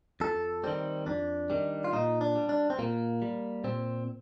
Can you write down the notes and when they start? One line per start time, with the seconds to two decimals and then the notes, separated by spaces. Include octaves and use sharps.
0.20 F2 A4
0.64 D#3 G3 C4
1.06 F2 D4
1.50 D#3 G3
1.84 F4
1.93 A#2 D#4
2.21 D4
2.35 G3
2.49 D4
2.70 C4
2.79 A#2 A#3
3.22 G3
3.64 A#2 C4